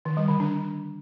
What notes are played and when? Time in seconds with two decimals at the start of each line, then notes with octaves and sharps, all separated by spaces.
0.05 D#3
0.17 G3
0.28 D3
0.40 D4